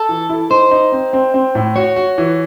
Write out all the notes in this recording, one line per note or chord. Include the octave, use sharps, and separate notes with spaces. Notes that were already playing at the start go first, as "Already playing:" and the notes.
Already playing: A4
E3
E4
D#4 C5
D#4
C4
C4
C4
A2
F#4 C#5
F#4
E3